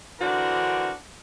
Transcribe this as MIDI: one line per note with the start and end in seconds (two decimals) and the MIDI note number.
0.20 0.92 50
0.20 0.92 52
0.20 0.92 62
0.20 0.92 66
0.20 0.92 70
0.20 0.92 72